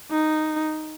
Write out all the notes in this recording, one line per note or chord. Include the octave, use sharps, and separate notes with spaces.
D#4